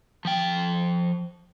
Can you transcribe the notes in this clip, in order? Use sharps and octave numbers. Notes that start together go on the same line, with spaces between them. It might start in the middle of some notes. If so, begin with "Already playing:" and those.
F3 G5